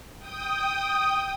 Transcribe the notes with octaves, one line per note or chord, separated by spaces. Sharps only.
G5 D#6